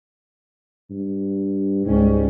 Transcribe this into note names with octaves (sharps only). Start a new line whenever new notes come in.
G2
C#2 G#2 G3 C#4